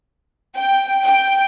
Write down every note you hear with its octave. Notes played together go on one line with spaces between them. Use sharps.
G5
G5